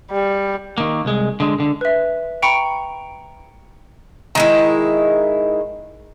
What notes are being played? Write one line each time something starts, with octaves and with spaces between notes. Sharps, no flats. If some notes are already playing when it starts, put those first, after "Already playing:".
G3
D#3 A#3
C2 G#3
D3 G#3
D3
B4 E5
G5 A#5 B5 C#6 C#7 D7
D#3 G#3 E4